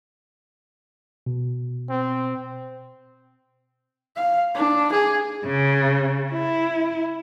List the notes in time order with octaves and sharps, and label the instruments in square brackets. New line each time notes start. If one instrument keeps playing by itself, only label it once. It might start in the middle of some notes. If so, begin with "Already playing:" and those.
[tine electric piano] B2
[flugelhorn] C4
[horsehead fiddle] F5
D4
G#4
[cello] C#3
E4